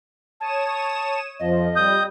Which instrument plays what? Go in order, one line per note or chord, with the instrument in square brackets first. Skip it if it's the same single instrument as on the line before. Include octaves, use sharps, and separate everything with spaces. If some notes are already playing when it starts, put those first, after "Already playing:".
[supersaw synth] C#5 D#6 E7 [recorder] A5
[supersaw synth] F2 F3 [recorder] D#5
[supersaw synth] G3 [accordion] D#6 G6